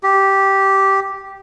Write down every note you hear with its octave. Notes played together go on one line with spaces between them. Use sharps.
G4